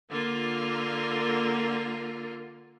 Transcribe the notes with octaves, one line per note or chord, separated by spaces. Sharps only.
D3 A#3 F4